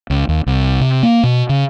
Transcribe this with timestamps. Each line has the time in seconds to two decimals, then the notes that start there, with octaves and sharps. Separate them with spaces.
0.10 C#2
0.29 D#2
0.47 C2
0.81 C3
1.03 A#3
1.23 B2
1.49 C#3